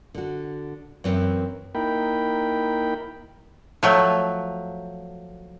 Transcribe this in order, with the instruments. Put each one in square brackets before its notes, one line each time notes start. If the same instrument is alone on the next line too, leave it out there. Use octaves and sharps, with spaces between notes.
[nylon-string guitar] D3 F#4
F#2 E3 C4 B4 E5
[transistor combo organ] A#3 D#4 E4 A#4 G5 B5
[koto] F3 F#3 A3